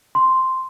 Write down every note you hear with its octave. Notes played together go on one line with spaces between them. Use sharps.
C6